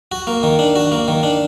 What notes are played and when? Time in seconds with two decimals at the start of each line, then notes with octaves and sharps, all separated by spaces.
0.12 F#4
0.27 A#3
0.43 D#3
0.59 D4
0.76 F#4
0.92 A#3
1.08 D#3
1.23 D4